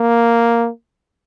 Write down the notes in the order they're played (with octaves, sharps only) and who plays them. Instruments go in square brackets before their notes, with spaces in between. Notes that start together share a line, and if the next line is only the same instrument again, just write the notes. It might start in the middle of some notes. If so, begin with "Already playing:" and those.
Already playing: [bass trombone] A#3